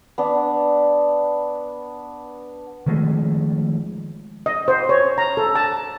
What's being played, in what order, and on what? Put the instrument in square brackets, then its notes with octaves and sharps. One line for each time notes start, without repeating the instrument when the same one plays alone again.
[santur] B3 D4
[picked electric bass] D#3 F3 G#3 A3
[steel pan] D#5
C5
C#5
A#5
A4
A5